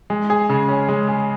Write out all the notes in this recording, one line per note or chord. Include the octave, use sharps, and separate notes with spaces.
G#3
G#4
C#3
C#4
G#3
G#4